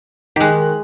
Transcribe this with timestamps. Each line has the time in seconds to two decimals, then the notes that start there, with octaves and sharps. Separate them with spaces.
0.36 D#3 G#3 G4 F#6